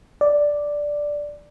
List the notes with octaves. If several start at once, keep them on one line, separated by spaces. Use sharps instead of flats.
D5